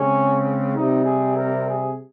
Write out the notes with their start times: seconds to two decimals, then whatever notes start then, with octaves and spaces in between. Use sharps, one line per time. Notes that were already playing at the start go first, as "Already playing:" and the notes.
Already playing: C#3 G#3 C4 C#4
0.76 C3 G3 C4 D#4
1.05 G#4
1.36 A#4
1.67 G#4